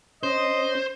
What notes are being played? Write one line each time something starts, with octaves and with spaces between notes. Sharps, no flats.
C#4 C5 D#5